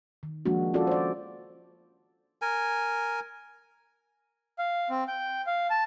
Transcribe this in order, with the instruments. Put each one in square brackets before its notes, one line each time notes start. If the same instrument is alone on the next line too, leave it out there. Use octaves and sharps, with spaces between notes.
[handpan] D#3
F3 G#3 A#3 D4 F#4
C#4 F4 F#4 A4 D5
C5 D5
[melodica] A#4 G#5
[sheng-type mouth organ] F5
C4
G5
F5
A5